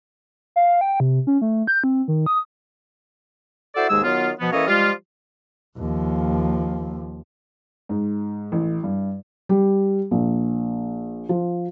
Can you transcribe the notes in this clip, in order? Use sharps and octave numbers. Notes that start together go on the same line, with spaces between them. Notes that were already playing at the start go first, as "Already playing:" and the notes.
F5
G5
C3
C#4
A3
G6
C4
D#3
D#6
E4 F#4 A4 C5 D5
D#2 G#2 G#3 G#4 E6
D#3 F#3 B3 F4
B2 F3 B3
E3 A#3 C#4 A4 C#5 D#5
F3 G3 G#3 F4
D#2 F3
G#2
A1
G2
G3
A#1
F3